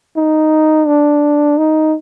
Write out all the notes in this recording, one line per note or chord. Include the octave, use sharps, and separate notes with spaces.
D#4
D4
D#4